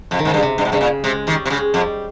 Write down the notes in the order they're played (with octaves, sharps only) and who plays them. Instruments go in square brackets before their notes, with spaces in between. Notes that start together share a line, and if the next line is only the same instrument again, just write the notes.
[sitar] F2 [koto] C#3
[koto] D#3
[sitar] G#2 [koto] C#3
[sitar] G2
[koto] C3
[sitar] G2
G#2
[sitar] G2 [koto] C#3
[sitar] A#2
[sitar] C3 [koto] G#3
[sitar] D#3 [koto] G3
[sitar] C3
[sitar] C#3 [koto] G#3
[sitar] F2 [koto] G3